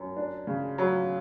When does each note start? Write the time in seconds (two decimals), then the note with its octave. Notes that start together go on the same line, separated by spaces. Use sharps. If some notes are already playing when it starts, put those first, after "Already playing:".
Already playing: F#2
0.17 D4
0.47 C#3
0.78 F#3